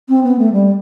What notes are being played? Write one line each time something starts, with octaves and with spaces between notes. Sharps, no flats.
C4
B3
A3
G3